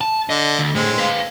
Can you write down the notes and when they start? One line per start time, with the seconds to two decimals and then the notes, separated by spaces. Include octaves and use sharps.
0.01 A5
0.30 D3 D#5
0.59 D2
0.75 A2 G#3 A3 C4
0.98 B4 F5